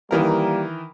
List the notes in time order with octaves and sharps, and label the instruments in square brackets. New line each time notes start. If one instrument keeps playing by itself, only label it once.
[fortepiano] D#3 E3 A#4 [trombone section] G3 A#3